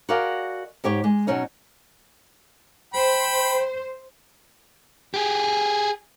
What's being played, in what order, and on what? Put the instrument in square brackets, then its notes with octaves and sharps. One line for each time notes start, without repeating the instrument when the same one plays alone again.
[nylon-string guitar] F#4 G#4 A#4 D5 D#5 F5
G#2 G4 C#5 G5
G#3
B2 F#3 C#4 D#4
[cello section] C5 [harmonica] G5 B5
[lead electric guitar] G4 G#4